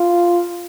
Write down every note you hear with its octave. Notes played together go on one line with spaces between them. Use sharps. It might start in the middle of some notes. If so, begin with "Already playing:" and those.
Already playing: F4